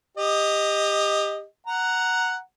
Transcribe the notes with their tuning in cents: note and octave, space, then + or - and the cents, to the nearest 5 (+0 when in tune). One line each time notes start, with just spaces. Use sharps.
G4 +25 D#5 +0
F#5 +0 A#5 +0